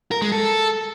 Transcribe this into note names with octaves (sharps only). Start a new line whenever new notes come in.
A#4
G#3
A4